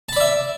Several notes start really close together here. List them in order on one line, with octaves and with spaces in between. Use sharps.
A5 B5 D5 E5